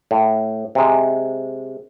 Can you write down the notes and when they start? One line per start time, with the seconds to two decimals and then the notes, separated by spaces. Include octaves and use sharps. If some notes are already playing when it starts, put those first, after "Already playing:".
0.11 A2
0.75 C3 G#3